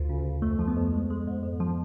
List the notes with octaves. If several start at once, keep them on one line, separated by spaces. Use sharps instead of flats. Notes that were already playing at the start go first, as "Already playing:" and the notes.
Already playing: D2 F4
C#3
D2
F2 A3
F3
B3
F2
G#3
G#3
G#2
F2
F3